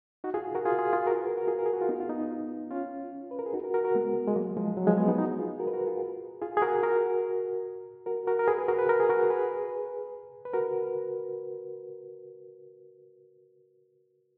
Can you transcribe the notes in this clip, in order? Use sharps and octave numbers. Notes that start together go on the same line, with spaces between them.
D#4 F#4
F4 G#4
F#4 A#4
F4 G#4
F4 G#4
F4 G#4
F#4 A#4
G#4 B4
F#4 A#4
F#4 A#4
F4 G#4
A#4
G#4
F#4
F4
B3 D#4
F4
B3 D#4
C#4 F4
B4
A#4
G#4
D#4 F#4
F#4 A#4
F#4 A#4
F#4 A#4
G#3 B3
G#3
F#3 A#3
F3 G#3
F#3
F3 G#3
G#3 B3
B3 D#4
D#4 F#4
F4 G#4
F#4 A#4
B4
F#4 A#4
F4 G#4
F4 G#4
G#4
F#4 A#4
F#4 A#4
F#4 A#4
F#4 A#4
A#4
G#4 B4
G#4 B4
F#4 A#4
B4
A#4
G#4
F#4 A#4
G#4 B4
B4
F#4 A#4